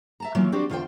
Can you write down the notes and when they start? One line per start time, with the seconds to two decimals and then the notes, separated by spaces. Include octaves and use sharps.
0.20 E5 A5 A#5
0.35 D#3 E3 F#3 A#3 C#4 F4
0.52 C4 D4 F#4 G4 D5
0.70 E2 D3 F4 G#4 C5 G5